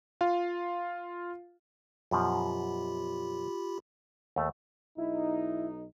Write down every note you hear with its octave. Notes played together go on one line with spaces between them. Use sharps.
F4 F5
F#2 B2 F3 F4 G4 B5
D#2 A3
B1 D#4 E4